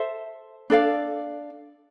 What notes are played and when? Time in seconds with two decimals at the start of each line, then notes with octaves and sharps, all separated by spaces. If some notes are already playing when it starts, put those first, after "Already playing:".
Already playing: A4 C5 E5
0.70 D4 A4 D5 F5